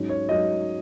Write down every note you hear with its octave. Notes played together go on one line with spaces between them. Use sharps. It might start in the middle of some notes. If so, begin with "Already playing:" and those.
Already playing: G#2 F#3 C#4
C#5
G#2 F#3 C#4 D#5